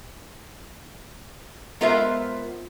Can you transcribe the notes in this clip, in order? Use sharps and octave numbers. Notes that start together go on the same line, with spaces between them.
G#3 B3 F4 A#4 C5 E5